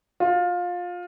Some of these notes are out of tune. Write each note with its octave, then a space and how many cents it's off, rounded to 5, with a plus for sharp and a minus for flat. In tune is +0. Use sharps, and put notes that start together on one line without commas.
F4 +20